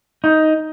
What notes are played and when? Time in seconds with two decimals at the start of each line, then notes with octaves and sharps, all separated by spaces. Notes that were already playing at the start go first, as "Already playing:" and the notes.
0.24 D#4